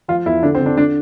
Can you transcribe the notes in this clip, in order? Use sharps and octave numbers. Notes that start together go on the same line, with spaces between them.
F3 F4
E2 E4
D3 D4
C4
D3
D4
D4